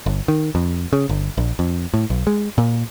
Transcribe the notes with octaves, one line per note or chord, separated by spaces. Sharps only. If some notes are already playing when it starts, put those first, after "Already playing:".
G1
D#3
F2
C#3
G1
A#1
F2
A2
B1
G#3
A#2